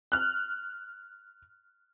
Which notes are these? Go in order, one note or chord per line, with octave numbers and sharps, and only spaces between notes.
F6 F#6